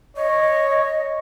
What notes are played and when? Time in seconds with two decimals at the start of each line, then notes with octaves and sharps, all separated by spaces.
0.17 C#5 D#5